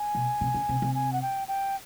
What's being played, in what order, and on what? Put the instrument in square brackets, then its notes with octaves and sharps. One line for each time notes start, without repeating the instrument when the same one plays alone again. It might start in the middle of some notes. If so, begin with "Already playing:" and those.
Already playing: [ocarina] G#5
[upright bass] B2
C3
C#3
C3
C3
[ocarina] G#5
F#5
G5
G5